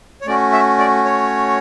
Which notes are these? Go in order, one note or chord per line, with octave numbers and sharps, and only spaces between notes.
C#5
A3 C#4 F#4 D5
E5
D5
C#5